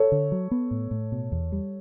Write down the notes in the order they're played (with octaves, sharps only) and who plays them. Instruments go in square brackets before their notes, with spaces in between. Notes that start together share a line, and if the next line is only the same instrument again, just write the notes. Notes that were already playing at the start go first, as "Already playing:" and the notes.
Already playing: [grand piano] A4 C#5
[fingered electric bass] D3
F#3
B3
A2
A2
B2
E2
G3